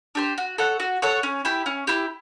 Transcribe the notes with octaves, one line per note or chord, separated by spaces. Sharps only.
D4 G4 C5
F#4
A4 C#5 F#5
F#4
A4 C#5 F#5
C#4
E4 G4
C#4
E4 G4